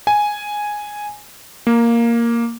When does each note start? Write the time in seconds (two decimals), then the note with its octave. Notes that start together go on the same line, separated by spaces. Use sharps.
0.07 G#5
1.67 A#3